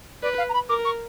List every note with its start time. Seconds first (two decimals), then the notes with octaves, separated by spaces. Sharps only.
0.23 B4 D5
0.38 F5
0.49 A#5
0.54 B5
0.69 A#4 D6
0.85 C#6